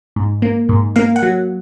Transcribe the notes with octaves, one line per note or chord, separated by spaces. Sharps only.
G#2
A#3
G#2
A#3 F5
F#5
F#3